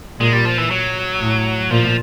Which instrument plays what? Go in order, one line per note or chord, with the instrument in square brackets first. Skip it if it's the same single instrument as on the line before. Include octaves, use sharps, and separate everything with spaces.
[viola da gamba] A#2 [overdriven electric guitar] G#3
[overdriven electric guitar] G3
F3
E3
F#3
[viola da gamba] A2
[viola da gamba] A#2 [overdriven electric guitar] F3